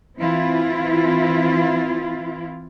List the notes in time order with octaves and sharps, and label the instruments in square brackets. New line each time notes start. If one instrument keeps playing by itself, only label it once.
[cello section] E3 C4 E4 F4